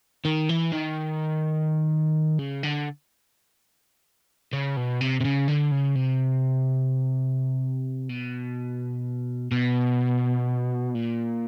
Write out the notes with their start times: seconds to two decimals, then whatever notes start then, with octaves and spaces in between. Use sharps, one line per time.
0.25 D#3
0.49 E3
0.72 D#3
2.39 C#3
2.63 D3
4.53 C#3
4.77 B2
5.01 C3
5.20 C3
5.25 C#3
5.48 D3
5.72 C#3
5.95 C3
8.10 B2
9.51 B2
10.95 A#2